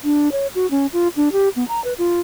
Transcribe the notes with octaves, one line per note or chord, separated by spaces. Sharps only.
D4
C#5
F#4
C#4
F4
D4
G4
B3
A#5
B4
F4